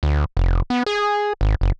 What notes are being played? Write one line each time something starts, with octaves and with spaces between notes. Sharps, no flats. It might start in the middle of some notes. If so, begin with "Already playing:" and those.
D2
F1
B3
G#4
G#1
F#1